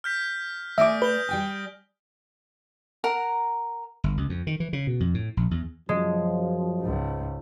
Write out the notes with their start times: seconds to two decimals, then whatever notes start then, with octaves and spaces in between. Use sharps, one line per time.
0.04 F6 G6 B6
0.78 A3 D5 E5 G#5 D6 D#6 A#6 D7
1.02 B4 G6 G7
1.29 G3 G5 G#5
3.04 A#4 F#5 A#5
4.04 G1
4.17 C#2
4.29 F2
4.47 D#3
4.60 E3
4.73 C#3
4.87 B2
5.00 F2
5.14 A2
5.37 A#1
5.51 E2
5.89 F#2 F3 G#3
6.81 C#2 G#2